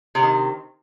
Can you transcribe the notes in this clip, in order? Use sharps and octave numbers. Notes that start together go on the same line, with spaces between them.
C3 D#3 C4